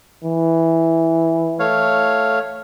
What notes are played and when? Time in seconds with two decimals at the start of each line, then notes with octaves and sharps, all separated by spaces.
0.24 E3
1.59 A3 C#5 F5